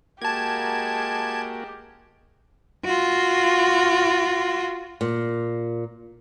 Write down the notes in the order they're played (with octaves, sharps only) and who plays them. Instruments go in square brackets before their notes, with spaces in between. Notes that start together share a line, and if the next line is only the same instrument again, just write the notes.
[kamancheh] G#3 G4 [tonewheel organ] A#3 F#4 A#4 [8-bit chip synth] A5 G#6
[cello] F4 F#4
[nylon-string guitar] A#2